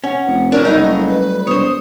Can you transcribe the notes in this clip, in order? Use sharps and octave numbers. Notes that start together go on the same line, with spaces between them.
C#4 F#5
F1
F3 F#3 D4 A#4
F#1 F#3 G3 A3 D#4 D#5
B4
E1 C5 C#5 D#6